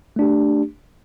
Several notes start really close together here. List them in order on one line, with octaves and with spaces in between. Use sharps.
A3 D4 G4